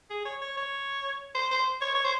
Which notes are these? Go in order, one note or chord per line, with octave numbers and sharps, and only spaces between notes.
G#4
C#5
C#5
C#5
C5
C5
C#5
C#5
C5